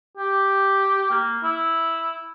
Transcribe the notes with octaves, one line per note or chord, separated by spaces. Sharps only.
G4
A#3
E4